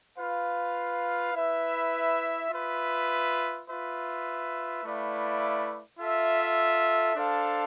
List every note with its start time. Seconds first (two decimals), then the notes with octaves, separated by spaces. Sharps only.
0.18 F4 B4 F5
1.34 E4 B4 E5
2.50 F4 B4 E5
3.67 F4 B4 E5
4.83 A3 E4 B4 D5 F5
5.99 F4 A4 E5
7.16 D4 A4 C5 F5